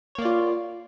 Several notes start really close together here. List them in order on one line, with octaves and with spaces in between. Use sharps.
C#5 A#3 D5 F4